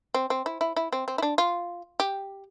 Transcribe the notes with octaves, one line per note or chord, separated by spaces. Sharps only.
C4
C4
E4
E4
E4
C4
C4
E4
D4
F4
G4